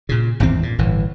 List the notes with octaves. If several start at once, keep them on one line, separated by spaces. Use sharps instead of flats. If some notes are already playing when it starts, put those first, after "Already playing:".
A#2 C#3
G#1 E2 G#2 C4
A#2
G1 A2 E3